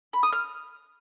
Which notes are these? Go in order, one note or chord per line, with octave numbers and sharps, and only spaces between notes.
B5
D#6
F6